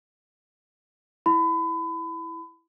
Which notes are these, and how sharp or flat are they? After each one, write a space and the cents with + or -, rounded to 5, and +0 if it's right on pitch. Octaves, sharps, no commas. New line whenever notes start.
E4 +0 B5 +30